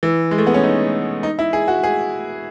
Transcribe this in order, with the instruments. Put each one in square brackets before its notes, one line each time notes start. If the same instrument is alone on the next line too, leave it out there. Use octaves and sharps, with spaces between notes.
[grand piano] E3
G#3
A3
B3
C#4
D#4
D#4
E4
G#4
F#4
G#4